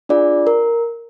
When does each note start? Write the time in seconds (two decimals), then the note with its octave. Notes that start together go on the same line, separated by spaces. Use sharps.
0.09 D4 F4 G#4 D5
0.47 A#4